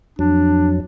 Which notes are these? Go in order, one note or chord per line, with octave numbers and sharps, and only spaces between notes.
F2 F#3 D4